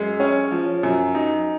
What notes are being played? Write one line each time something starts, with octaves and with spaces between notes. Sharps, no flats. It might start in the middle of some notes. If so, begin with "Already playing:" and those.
Already playing: F#2 G#3
C#4
F3
F#2
D#4